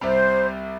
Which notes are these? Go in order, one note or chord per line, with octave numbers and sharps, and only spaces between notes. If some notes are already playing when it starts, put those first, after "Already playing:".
C2 C3 G3 C5